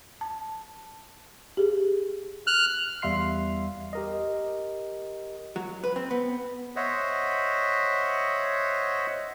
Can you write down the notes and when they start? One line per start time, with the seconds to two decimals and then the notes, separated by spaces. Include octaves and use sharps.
0.21 A5
1.57 G4 G#4
2.47 F6 F#6
3.02 E2 G3 E5 F5 C6 C7
3.93 G4 A#4 D#5
5.56 F#3
5.84 B4
5.96 C4
6.11 B3
6.76 C5 C#5 D#5 E5 F#5